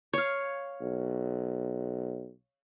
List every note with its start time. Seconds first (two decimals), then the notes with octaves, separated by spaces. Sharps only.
0.13 C#5 F5
0.81 B1